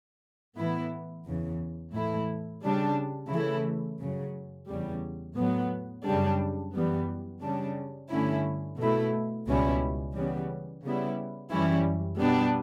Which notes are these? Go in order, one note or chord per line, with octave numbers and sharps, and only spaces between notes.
A2 E3 B3 E4
E2 C#3 E3
A2 E3 A3 E4
C#3 G3 D4
C#3 E3 A3 E4
F#2 C#3 F#3
E2 C#3 G3
A2 F#3 B3
F#2 C#3 G3 D4
F#2 E3 G3 B3
C#3 G3 D4
G2 D3 A3 C#4 E4
B2 A3 E4
C#2 B2 G3 C#4 E4
C#3 E3 G3 B3
C#3 G3 B3 E4
F#2 E3 G3 C#4 E4
B2 G3 B3 D4